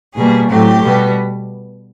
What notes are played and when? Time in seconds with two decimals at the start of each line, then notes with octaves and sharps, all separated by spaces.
0.14 B2 G3 A#3 G#4
0.48 A2 F#3 A3 C4 G4
0.82 B2 G3 B3